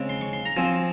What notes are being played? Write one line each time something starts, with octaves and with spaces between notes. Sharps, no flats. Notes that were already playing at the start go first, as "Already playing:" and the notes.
Already playing: C#3 G#3 C4
C6
C#6
C6
A#5
F3 C4 G#5